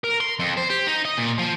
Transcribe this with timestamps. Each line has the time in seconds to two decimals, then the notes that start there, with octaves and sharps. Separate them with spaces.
0.04 A#4
0.21 C6
0.39 F2
0.57 C5
0.70 G4
0.87 D#4
1.05 D#5
1.18 A#2
1.39 F3